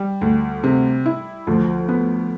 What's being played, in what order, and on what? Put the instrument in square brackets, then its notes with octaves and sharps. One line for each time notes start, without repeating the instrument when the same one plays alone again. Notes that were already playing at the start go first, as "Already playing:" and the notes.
Already playing: [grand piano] G3
[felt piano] D2
C3
E4
[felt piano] D2 [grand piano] F3
[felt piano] B3